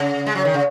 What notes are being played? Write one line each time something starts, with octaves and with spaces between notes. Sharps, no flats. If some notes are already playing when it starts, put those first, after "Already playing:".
Already playing: C#3
G#3
F#3
D#3
C#3